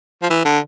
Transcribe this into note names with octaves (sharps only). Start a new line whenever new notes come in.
F3
E3
D3